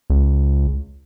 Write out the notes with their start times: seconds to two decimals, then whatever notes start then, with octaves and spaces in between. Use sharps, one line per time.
0.10 C#2